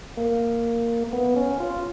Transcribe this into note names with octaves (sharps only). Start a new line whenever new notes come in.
A#3
B3
C#4
F4